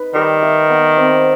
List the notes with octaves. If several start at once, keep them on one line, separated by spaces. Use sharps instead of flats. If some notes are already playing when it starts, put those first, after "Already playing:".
Already playing: D#4 B4
D#3 G3
E5
B3
C4